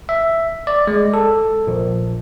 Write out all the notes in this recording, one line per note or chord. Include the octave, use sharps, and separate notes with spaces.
E5
D5
G#3
A4
A#1